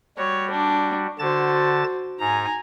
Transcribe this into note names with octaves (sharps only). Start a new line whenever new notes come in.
G3 F#4 C#5
D4
D3 F#4 C5 A5 A6
G#2 G#5 A#5